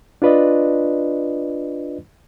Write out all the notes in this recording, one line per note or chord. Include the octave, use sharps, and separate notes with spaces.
D4 F4 B4 D5 D#5